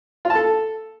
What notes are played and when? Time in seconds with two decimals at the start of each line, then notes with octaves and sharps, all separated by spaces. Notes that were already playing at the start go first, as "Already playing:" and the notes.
0.25 F4
0.30 A5
0.35 A4